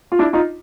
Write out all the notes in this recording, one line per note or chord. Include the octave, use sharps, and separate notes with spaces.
F4
D4 E4
D#4 F4